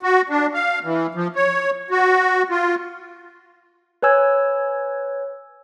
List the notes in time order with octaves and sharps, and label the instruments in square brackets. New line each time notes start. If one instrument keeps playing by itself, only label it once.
[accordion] F#4
D4
F5
E3
F3
C#5
F#4
F4
[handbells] B4 C#5 G#5 E6 G#6